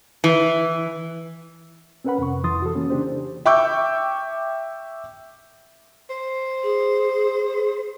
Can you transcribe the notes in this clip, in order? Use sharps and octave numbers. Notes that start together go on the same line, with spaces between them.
E3
C4 C#4 A#4 B4 F#5 B5
F2 C3 C#6
F2 E3 E4 C6 D#6 A6
F#4 A4
E3 A#3 C#4
C#3 D4 G4 C5
E5 G5 C#6 D6 E6 G6
C5
G#4